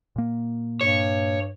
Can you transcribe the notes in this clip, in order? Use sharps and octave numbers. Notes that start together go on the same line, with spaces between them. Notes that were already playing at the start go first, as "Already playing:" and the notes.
A#2 A#3
G2 C#5